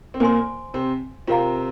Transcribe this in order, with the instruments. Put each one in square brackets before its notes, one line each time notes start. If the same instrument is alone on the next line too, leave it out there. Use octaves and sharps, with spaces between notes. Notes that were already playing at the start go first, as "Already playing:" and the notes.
[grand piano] C4
[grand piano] A#2 A#3 [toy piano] C5 G#5 C6
[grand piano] C3 C4
[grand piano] C3 C4 [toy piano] F4 A#4 F5 A#5